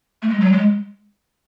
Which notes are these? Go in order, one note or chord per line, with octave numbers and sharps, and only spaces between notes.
A3
G#3
F#3
G#3